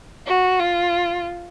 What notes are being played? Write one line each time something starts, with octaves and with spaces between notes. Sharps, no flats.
F#4
F4